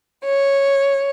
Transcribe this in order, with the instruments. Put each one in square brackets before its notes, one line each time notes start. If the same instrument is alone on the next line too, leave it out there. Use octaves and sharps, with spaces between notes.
[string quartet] C#5